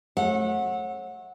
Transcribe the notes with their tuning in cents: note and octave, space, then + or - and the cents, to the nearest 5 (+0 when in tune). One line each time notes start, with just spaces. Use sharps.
A3 -20 C#5 -35 F#5 -20